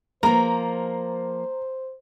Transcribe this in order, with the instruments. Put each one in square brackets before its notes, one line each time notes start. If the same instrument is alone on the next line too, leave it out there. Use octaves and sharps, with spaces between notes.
[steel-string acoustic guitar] F3 A#3 [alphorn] C5 [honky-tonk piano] A#5